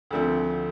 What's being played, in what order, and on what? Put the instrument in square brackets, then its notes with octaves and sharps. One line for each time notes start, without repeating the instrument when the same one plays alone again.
[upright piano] D2 D3 F3 C4